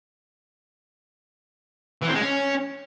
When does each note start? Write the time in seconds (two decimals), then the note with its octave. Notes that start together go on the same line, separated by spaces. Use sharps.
2.02 E3
2.08 C4
2.14 G#3
2.21 C#4